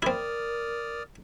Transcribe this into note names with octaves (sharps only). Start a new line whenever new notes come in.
C4 E4 A#4 D5 D#6 F6